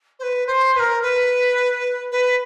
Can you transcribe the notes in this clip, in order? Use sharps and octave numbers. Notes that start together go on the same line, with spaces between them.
C5
B4
C5
B4
A#4
B4
B4